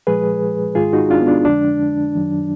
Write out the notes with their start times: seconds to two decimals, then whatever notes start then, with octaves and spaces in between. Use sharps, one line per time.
0.07 A#2 F3 G#3 G#4 B4
0.75 G#2 D#3 G#3 F4 G#4
0.93 D#4 F#4
1.10 D4 F4
1.21 B3
1.28 D4
1.45 F2 D3 F3 G#3 D4
2.14 F#2 D#3 F#3